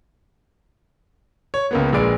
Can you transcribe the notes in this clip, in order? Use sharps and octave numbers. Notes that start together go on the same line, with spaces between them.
C#5
C#2 A#3 B3
A#1 A#2 G#3 B4 D5 D7